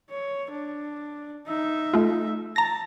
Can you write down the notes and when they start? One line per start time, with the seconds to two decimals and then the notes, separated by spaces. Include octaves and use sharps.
0.10 C#5
0.51 D4
1.47 D#4 E5
1.94 A3 F4
2.56 A5 A#5 A#6